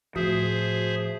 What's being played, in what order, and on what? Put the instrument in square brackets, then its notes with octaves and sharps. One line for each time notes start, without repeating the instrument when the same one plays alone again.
[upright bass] A2 [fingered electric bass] F3 [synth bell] F#4 [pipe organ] G#4 C5 E5